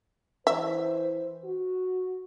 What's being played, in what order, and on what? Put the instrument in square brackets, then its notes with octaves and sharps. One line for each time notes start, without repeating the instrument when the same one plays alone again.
[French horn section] E3 C5 [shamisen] E5
[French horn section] F#4